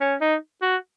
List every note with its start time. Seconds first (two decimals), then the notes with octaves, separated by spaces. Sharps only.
0.01 C#4
0.21 D#4
0.62 F#4